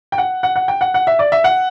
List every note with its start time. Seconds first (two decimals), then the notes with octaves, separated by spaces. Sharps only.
0.12 G5
0.18 F#5
0.43 F#5
0.56 F#5
0.68 G5
0.81 F#5
0.94 F#5
1.07 E5
1.19 D5
1.32 E5
1.44 F#5